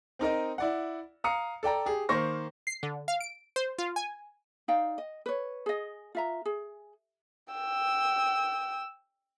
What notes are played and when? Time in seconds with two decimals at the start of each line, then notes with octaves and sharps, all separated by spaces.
0.19 C4 D#4 A#4 D#5
0.58 E4 D5 F#5
1.24 F5 A#5 D#6 C#7
1.63 A4 D5 G5 A#5
1.86 G4 G#4
2.09 D#3 A#3 C5 C#6 A#6
2.67 C7
2.83 D3
3.08 F5
3.21 D7
3.56 C5
3.78 F4
3.96 G#5
4.68 D#4 D5 F5 G5
4.98 D#5
5.26 B4 C#5
5.66 G#4 D#5
6.15 F4 E5 A#5
6.45 G#4
7.53 G5 E6